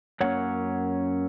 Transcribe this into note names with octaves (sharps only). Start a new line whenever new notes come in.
F#2 F#3 A#3 C#4 C#5 F#5